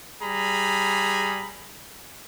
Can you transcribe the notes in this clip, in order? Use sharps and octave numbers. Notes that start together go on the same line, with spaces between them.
G3 G#4 A#5 B5